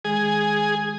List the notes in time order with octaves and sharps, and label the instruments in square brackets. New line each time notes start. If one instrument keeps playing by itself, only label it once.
[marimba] D#3 G#3 [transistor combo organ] G#4